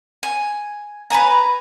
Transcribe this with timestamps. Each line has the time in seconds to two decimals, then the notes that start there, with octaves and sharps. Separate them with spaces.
0.23 G#5
1.10 B4 D5 G#5 A#5